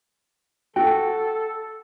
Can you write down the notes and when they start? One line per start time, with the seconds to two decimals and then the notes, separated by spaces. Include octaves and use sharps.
0.76 F#4 A4 G5